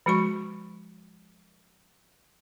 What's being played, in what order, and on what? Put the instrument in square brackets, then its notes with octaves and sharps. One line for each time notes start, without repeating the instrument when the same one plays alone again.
[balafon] F3 G#3 F#4 C#6